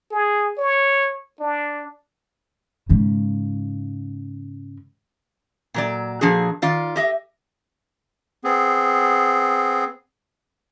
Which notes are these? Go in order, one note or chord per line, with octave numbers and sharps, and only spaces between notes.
G#4
C#5
D4
G#2 C#3
A#2 F#3 D5
A#2 F3 D4 F#4 G#4
D#3 F4 D5
G4 D#5 E5
B3 C4 G#4